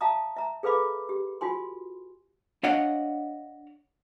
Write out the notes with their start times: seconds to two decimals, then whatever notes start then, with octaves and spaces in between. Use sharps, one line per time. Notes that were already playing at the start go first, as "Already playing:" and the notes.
0.01 E5 F5 A5 A#5 D#6
0.36 E5 A#5
0.63 G#4 A4 B4 F5 B5 D6
1.09 G4
1.41 F4 F#4 G#5 C6
2.63 D4 C#5 D#5 F5 F#5